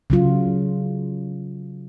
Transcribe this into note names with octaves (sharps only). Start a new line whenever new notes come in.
C#3 F#3 F4